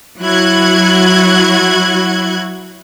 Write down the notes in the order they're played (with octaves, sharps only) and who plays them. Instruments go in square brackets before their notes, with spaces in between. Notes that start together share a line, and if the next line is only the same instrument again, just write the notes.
[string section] F#3 E4 F#4 F#6 G#6